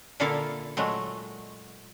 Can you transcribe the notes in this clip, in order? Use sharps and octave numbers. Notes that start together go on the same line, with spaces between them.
A#2 D3 A#3 E4 A4 F5
A#2 F#3 G#3 A3